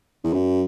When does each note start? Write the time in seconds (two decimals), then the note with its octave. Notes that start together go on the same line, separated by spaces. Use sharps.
0.24 E2
0.33 F#2